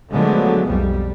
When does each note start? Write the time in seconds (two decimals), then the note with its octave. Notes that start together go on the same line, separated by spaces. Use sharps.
0.11 D3 F3 F#3 G#3 A3 B3
0.67 B1 F2 G3